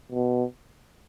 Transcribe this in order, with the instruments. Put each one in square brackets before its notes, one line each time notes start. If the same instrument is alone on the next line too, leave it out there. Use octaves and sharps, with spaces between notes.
[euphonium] B2